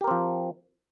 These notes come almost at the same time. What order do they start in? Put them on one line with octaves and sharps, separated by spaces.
G4 A#4 C4 F3